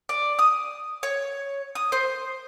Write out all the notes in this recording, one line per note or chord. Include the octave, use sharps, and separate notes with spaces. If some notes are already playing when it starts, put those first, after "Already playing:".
D5
D#6
C#5
D#6
C5